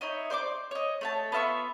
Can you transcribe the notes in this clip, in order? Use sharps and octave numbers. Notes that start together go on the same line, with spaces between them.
D#4 E4 C#5 D#5
C5 D5 C#6 D6
C#5 D#5
A3 C#5 A5
B3 F4 E5 C#6